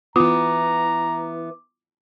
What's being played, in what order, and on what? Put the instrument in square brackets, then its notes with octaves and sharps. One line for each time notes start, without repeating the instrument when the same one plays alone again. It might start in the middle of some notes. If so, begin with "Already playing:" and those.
[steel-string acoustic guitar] E3 B3 [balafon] F4 [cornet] A#5 [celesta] D6